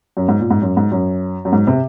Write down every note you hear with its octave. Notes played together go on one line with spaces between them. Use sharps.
F#2
G#2
A#2
G#2
F#2
G#2
F#2
F#2
G#2
C3